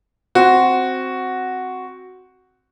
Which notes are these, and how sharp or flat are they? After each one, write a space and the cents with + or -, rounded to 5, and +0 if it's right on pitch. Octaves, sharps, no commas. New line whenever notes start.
C4 +0 F#4 +0